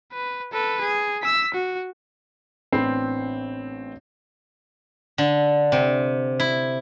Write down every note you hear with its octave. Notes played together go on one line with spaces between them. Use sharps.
B4
A4 B4
G#4
E6 B6
F#4
A1 B3 C4 D4 B5 C7
D3
C3
E4